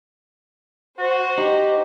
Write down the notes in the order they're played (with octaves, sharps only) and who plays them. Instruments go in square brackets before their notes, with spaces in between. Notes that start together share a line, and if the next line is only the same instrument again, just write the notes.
[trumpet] F#4 [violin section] C5
[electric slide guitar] D#4 [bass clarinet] G4